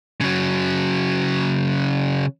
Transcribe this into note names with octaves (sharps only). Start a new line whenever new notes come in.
C#3 F#3